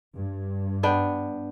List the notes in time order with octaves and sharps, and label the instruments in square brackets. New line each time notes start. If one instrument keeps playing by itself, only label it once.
[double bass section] G2
[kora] B3 D4 G5